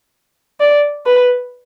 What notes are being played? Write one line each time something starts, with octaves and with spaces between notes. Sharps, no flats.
D5
B4